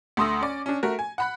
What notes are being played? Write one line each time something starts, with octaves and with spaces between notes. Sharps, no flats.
D2 A3 C6 D#6 E6 A#6
C#4 D5
C#4 D4
A3 F#4 A#4
G#5
F#5 B5 F#6